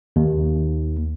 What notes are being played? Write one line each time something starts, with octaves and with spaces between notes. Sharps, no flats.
D#2